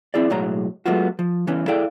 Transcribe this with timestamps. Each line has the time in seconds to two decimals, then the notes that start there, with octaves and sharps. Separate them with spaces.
0.14 C4 E4 G#4 D5
0.30 B1 A2 F#3 G#3 C#5 A#5
0.86 F#3 G#3 A3 B3 F4 F#4
1.19 F3
1.47 E3 B3 C#4
1.68 E4 G#4 A4 D5 F5 G5